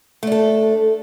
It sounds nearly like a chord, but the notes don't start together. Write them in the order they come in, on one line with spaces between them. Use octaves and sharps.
A3 D4 A4